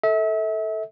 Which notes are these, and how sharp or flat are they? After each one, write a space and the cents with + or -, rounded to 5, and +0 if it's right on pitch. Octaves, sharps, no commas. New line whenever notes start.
A4 +0 E5 -35